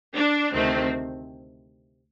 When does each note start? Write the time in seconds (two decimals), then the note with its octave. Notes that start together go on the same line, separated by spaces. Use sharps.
0.15 D4
0.52 D2 C3 D#3 A3 C4